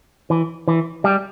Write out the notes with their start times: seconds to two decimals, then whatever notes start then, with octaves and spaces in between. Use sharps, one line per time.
0.30 E3
0.68 E3
1.04 G3